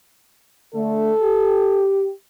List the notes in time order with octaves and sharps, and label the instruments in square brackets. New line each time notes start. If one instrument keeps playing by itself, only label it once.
[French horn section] D3 A3 [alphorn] A4
[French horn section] G4